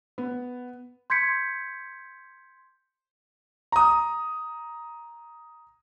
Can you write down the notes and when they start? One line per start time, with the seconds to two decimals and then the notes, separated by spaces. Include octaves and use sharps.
0.18 B3
1.10 C6 G6 G#6 B6 C#7
3.72 A#5 D#6